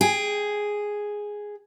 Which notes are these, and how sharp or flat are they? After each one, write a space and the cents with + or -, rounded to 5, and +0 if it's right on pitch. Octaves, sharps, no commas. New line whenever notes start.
G#4 +0 G5 +25